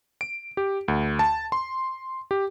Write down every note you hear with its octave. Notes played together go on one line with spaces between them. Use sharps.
D7
G4
D2
A5
C6
G4